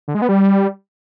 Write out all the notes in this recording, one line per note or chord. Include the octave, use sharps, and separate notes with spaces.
D3
G#3
B3
G3